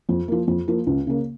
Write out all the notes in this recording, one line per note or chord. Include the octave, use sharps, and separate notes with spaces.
F2
F3 A#3
F2
F3 A#3
C#2
C#3 A#3